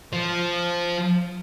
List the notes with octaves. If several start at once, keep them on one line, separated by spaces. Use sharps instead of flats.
F3